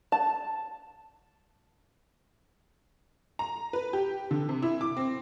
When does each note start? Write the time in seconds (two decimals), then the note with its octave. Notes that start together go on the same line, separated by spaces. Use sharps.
0.12 A5
3.39 A#5
3.73 B4
3.93 G4
4.31 D3
4.49 C3
4.62 E4
4.81 D6
4.97 C4